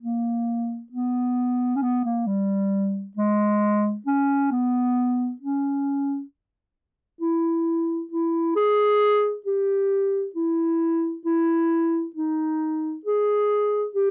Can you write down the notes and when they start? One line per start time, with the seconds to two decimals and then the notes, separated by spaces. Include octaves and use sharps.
0.03 A#3
0.92 B3
1.76 C#4
1.82 B3
2.05 A#3
2.27 G3
3.17 G#3
4.07 C#4
4.52 B3
5.42 C#4
7.21 E4
8.12 E4
8.56 G#4
9.46 G4
10.36 E4
11.26 E4
12.16 D#4
13.06 G#4
13.95 G4